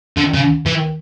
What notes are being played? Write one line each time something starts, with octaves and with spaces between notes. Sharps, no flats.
D3
C#3
E3